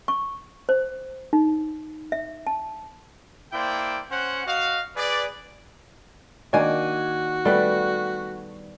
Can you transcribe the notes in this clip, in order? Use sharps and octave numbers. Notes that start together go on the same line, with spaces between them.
C#6
C5
D#4
E5
A5
A#3 E4 C5 D5 G5
C#4 C5 F#5
F#4 D#5 F5
G#4 B4 D5
D#3 A#3 D4 F#4 G#5
G3 A3 B3 F#6